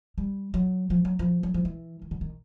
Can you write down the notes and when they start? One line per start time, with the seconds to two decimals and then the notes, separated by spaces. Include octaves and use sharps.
0.18 G3
0.54 F#3
0.90 F3
1.05 F#3
1.19 F3
1.43 F#3
1.54 F3
1.65 E3
2.02 D#3
2.11 D3
2.21 D#3